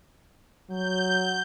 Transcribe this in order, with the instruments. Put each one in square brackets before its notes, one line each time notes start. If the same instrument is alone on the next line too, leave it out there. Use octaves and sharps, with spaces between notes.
[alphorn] F#3 [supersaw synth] G6